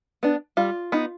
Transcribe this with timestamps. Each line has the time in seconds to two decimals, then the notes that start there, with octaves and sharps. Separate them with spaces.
0.23 B3 D4
0.57 G3 F4
0.92 B3 D#4